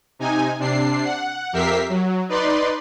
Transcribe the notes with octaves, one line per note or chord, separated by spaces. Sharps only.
C3 D#4 G#5
C3 D4 C7
F#5
F2 G4 A#4 E5 B6 C7
F#3
D#4 B4 D5 C6